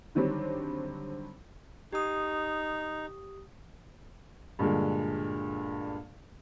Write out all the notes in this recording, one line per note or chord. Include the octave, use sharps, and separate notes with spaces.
D3 D#3 F#3 G3 C4 D4
D#4 G4 D#6
G2 A#2 D3 G#3